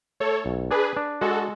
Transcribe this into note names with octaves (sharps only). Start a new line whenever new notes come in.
A3 A4 C#5
B1
D4 G#4 B4
D4
G#3 F#4 A4